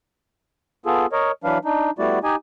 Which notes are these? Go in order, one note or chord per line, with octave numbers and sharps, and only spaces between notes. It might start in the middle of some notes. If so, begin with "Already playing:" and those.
B3 F4 G#4 A4
A#4 C#5 D#5
E3 F#3 D4 B4 F5
D4 D#4
G3 A3 B3 E4 F#4 D5
D#4 G4 D#5 G#5